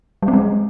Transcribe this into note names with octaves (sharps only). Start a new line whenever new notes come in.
G3
C4
G#3